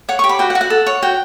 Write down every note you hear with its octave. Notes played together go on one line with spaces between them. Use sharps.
C#5 F#5
C#6
G4
B5
F#4 G5
F#5
F#4
F#5
A4
C#5
F#4 G5